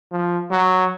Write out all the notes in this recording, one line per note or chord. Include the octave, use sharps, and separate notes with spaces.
F3
F#3